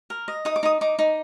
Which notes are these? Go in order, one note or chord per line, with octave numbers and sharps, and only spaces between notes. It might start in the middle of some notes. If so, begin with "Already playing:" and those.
A#4
D#5
D#4 D#6
D6
D#4 D#6
D#4 D6
D#4